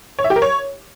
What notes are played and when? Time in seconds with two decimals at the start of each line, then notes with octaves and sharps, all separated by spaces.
0.19 C#5
0.24 E5
0.30 G4
0.36 A#4
0.42 C#5